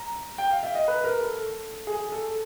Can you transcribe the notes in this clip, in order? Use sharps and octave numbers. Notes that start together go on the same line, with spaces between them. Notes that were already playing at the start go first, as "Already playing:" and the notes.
Already playing: A#5
G5
F5
E5
D#5
B4
A#4
A4
G#4
A4